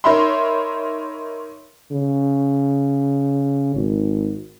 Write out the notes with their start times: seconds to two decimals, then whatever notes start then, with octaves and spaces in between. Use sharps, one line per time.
0.04 D#4 A#4 C#5 E5 B5 C6
1.92 C#3
3.75 G#1